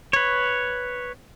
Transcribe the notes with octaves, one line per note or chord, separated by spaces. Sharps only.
B4 C#5